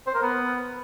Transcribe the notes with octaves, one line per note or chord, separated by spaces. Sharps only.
C5
A#4
B3